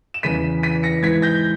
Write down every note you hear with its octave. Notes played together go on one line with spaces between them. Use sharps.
E7
E2 C#3 E3 B6 D#7
B6 D#7
A#6 C#7
G#2 E3 G#6 B6
G6 A#6